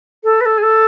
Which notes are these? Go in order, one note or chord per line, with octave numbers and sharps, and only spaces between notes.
A4
B4
A4
G#4
A4